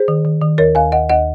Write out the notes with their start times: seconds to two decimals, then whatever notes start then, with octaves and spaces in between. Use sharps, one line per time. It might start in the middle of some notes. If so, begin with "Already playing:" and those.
Already playing: G#4 C5
0.08 D#3
0.25 D#3
0.42 D#3
0.58 D#2 A#4 C#5
0.75 D#2 F5 G#5
0.92 D#2 D#5 F#5
1.09 D#2 D#5 F#5